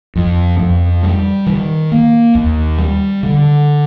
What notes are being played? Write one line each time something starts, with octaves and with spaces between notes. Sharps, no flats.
F2
F2
G3
D#3
A#3
D#2
G3
D3